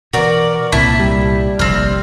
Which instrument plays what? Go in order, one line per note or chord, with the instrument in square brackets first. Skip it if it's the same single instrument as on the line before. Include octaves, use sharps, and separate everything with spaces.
[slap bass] B2 E3 [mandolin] F#4 D5 [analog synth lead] A#4
[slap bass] C2 A#2 C4 [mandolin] E4 [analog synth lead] A5
[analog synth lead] G3
[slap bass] F1 A#1 G2 [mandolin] C4 F6